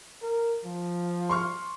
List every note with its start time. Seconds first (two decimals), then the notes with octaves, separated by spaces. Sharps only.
0.22 A#4
0.65 F3
1.29 C6 C#6 F6